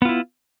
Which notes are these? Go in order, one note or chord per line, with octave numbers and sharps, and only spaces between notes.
B3 E4 F4